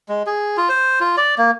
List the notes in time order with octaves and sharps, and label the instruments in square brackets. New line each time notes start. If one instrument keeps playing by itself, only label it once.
[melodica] G#3
G#4
F4
C5
F4
D5
A#3